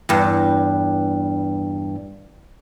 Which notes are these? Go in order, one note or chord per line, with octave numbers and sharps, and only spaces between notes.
E2 G2